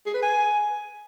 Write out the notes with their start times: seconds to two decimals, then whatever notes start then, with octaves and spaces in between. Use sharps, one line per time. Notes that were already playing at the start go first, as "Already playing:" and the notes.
0.06 G#4
0.14 B4
0.22 G#5